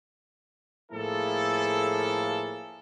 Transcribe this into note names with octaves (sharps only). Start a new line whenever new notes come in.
A2 F3 A#3 E4 G#4 A4